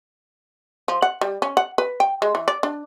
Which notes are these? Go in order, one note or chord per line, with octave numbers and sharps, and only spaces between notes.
F3
F#5
G3
C#4
F#5
B4
G5
G#3
E3
D5
D4